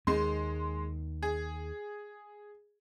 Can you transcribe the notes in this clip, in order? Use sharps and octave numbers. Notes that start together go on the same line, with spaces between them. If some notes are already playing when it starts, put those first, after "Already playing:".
D#2 G#3 C6
G#4